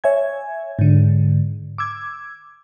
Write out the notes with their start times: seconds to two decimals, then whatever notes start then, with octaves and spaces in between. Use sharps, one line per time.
0.04 C#5 E5 G#5 G#6
0.79 G#2 D3
1.78 D6 E6 G#6